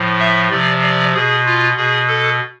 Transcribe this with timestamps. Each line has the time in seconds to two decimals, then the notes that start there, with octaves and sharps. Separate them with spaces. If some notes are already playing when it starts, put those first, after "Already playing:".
Already playing: A2 F3
0.19 E5
0.50 C3 F3 D5
0.82 D5
1.14 B2 G#4
1.46 F4
1.77 B2 G#4
2.08 A4